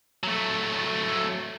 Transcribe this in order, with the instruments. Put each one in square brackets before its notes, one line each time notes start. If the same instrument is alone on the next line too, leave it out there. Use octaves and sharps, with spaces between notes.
[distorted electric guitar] F#3 A3